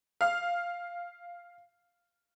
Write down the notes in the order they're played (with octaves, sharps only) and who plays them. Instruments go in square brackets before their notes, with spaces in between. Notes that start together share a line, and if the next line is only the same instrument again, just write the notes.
[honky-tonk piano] F5 F6